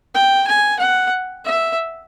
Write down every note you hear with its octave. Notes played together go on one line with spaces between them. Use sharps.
G5
G#5
F#5
E5